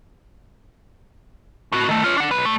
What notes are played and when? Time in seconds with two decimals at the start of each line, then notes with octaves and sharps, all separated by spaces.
1.72 A2 F#4
1.89 D#3 A3
2.04 F4 C#5
2.18 D4 F#5
2.31 B1 B4
2.45 A#2 A3